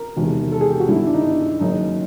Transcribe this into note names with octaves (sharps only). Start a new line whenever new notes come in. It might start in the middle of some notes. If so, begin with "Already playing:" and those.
Already playing: A#4
E1 E2 C3 D#3
A4
G#4
G4
F#4
G1 G2 D#3 E4
D4
D#4
D4
F#1 F#2 D#3 D#4